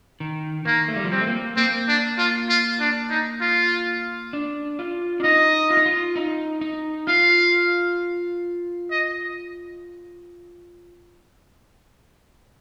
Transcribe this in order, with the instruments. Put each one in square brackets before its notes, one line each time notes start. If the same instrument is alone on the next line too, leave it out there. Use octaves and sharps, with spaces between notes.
[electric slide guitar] D#3
[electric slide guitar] D#3 [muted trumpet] A#3
[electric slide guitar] A3
G3
F3
[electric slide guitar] G3 [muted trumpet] C4
[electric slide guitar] A3
A#3
[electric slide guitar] A#3 [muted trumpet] C4
[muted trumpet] D4
F4
F4
D4
D#4
F4
[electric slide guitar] D4
F4
D4
[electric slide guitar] D#4 [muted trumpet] D#5
[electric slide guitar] F4
D#4
F4
D#4
D#4
[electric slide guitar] F4 [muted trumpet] F5
[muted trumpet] D#5